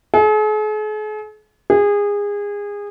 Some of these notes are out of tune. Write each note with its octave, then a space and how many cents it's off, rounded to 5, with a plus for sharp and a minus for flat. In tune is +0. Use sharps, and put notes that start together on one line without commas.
G#4 +45
G#4 -25